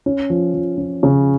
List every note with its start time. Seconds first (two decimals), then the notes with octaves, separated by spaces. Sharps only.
0.06 C#4
0.30 F3
0.54 F3
0.78 C#4
1.03 C#3